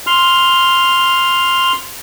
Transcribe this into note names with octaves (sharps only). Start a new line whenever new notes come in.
C6 F6